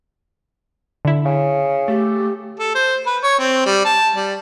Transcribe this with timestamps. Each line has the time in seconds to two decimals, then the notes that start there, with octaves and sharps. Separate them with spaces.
1.05 D3 E4
1.25 C#3
1.88 A3 G4
2.60 A4
2.75 C5
3.06 B4
3.23 C#5
3.39 C4
3.66 G3
3.85 A5
4.16 G3